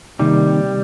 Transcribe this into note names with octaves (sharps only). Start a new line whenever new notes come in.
C3 D#3 G3 A#3 D#4